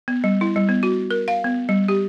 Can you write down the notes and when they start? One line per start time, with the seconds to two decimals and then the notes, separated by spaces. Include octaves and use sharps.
0.08 B3
0.24 G3
0.41 E4
0.56 G3
0.69 B3
0.83 F#4
1.11 A#4
1.28 F5
1.44 B3
1.69 G3
1.88 G4